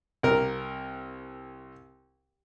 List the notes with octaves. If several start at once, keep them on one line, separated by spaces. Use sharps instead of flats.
C2 A#4